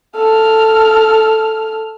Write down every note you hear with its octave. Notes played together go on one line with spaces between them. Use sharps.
A4 F6